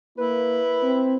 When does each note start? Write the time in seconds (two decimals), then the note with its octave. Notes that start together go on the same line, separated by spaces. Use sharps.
0.18 A#3 E4 B4
0.83 C4